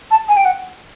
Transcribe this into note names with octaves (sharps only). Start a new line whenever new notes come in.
A5
G#5
G5
F#5